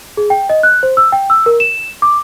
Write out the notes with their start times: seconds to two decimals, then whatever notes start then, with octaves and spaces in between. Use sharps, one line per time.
0.17 G#4
0.30 G5
0.49 D#5
0.63 F#6
0.83 C5
0.97 E6
1.12 G5
1.30 E6
1.46 A#4
1.60 E7
2.02 D6